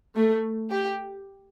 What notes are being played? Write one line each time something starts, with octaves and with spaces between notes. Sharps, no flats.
A3
G4